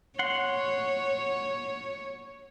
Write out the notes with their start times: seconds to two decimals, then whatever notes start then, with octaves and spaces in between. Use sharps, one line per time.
0.19 C#5 F#5 C6